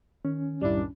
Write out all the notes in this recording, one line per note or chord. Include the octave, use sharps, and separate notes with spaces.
D#3 C#4
C2 F#2 A2 D#3 G3 D4 E4